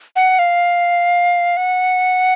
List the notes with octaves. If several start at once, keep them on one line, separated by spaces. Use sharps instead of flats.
F#5
F5
F#5